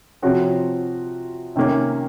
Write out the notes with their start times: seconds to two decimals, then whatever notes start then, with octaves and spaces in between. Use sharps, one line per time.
0.22 C3 F3 C4 F#4 C#5
1.56 C3 D#3 A#3 C#4